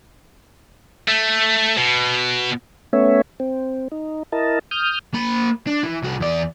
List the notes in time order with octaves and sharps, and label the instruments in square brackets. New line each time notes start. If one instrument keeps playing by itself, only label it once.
[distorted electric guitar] A3
B2
[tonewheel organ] A3 B3 C#4 C#5 E5
C4
D#4
E4 A#4 D#5 A5
D#6 F6 G6
[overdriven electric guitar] A#3 B5
D4
E3
C2 F#4
E2 D5